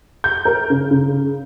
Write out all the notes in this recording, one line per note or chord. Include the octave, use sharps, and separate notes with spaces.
G6
A#4
C#3
C#3